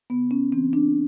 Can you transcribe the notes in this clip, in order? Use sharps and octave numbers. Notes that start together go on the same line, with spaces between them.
C#3 B3
C#4
E3 C4
D4